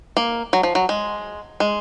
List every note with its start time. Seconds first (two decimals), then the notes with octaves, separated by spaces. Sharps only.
0.17 A#3
0.53 F#3
0.63 F3
0.75 F#3
0.89 G#3
1.60 G#3